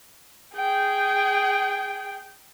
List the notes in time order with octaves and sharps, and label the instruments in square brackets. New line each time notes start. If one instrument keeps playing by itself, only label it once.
[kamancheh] G#4 G5